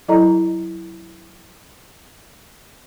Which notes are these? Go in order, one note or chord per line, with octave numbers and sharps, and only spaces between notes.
F#3 E4 A4 D5 D#5 A#5